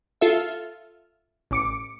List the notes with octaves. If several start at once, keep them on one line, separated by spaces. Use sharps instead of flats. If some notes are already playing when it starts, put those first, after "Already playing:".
F4 A4 E5
A1 D6 C#7